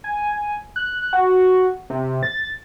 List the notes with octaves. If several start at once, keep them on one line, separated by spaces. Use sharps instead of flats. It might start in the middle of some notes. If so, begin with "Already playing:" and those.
G#5
F#6
F#4
C3
A6